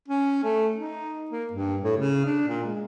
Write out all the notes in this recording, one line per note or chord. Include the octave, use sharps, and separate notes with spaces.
C#4
A3
D#4
A#3
G2
A2
C#3
D4
A#2
G#3